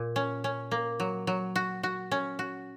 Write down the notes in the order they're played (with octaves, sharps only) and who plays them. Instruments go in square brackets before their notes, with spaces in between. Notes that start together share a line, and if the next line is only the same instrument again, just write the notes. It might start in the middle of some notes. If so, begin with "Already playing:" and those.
Already playing: [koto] A#2
C#4
C#4
A#3
F#3
F#3
F#4
F#4
C#4
F#4